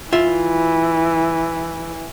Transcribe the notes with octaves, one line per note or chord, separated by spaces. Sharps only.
E3 F4 E5